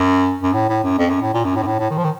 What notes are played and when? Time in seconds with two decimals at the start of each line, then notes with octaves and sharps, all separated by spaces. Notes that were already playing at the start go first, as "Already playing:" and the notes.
Already playing: F#2
0.42 F#2
0.53 A2
0.69 A2
0.83 F#2
0.98 F2
1.10 F#2
1.21 A2
1.34 A#2
1.45 F#2
1.56 A2
1.63 F#2
1.67 A2
1.79 A2
1.90 D#3
1.97 F3
2.04 D#3